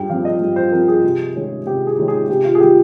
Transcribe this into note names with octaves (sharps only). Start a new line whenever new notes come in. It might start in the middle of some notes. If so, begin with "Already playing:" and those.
Already playing: G2 G5
F3 C4 F5
D#5
G2
C5
F3 C4 A#4
G#4
C3
D#3 G#3 C#4
C3 G4
G#4
D#3 G#3 C#4
G#4
C3 G4
F4
G#4
D#3 G3 G4